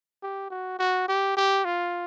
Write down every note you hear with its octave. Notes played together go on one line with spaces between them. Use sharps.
G4
F#4
F#4
G4
G4
F4